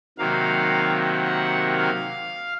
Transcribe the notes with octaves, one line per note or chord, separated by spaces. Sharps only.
C3 D#3 F#3 A#3 F5
F#5
F5